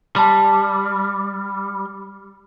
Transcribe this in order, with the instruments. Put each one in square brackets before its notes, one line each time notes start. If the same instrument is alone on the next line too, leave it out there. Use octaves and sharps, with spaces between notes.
[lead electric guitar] G3 [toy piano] A5 C6